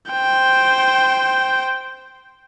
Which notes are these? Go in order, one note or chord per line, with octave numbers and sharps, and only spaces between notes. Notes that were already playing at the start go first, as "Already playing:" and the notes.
C5 G5